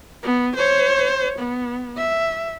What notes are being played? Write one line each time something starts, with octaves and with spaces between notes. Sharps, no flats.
B3
C5 C#5
B3
E5